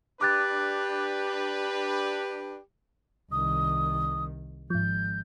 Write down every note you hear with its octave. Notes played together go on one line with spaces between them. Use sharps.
D4 G4 B4 D6 F#6 A6
C2 D#3 D#6
G#1 G#2 F3 G6